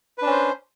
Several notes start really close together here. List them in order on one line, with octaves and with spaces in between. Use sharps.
B4 D4 C#4 C5